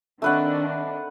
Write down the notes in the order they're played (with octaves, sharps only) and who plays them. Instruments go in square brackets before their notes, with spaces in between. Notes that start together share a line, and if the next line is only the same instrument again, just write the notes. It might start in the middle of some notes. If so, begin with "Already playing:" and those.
[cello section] D#3 C4 D4 [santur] A3 B4 F#5